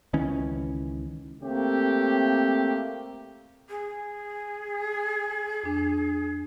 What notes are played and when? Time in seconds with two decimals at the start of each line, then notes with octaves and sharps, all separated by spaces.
0.13 C#2 D#3 E3 C#4
1.42 A3 A#3 C4 G4
3.68 G#4
5.63 F2 D4